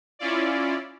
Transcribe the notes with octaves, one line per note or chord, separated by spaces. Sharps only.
C#4 E4 F4 D5